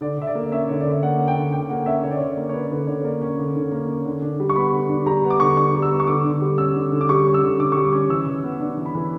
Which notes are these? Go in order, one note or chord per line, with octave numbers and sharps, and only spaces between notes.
D3 D5
D3 E5
D5
A#3
C#4 E5
D3 C#5
D3 D5
E5
A#3 F#5
C#4
G5
D3
D3 G5
A#3 F#5
C#4 E5
D3 C#5
D5
D3 C#5
A#3
C#5
C#4 B4
D3 B4
D3 C#5
A#3 D5
C#4
D3
D3
A#3
C#4
D3
D4
G3
C#6
B3 B5
D3
D4
G3 A#5
B3
D6
D3 C#6
D4 C#6
G3
E6
B3
C#6
D3 D6
D3
G3
C#4 E6
D3
D3
D6
G3 C#6
C#4
E6
D3
D3 D6
G3 C#6
D6
C#4
E3 E6
E3
B3
D4
E3
B5
E3